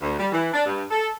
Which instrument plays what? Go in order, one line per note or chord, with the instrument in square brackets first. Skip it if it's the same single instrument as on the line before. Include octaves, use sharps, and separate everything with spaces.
[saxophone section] D2
G3
E3
D4
G2
A4